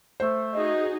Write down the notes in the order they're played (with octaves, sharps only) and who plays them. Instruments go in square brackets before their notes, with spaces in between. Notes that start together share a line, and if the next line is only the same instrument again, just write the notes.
[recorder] A3 [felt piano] C5
[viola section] D#4 F#4 G#4 [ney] D#5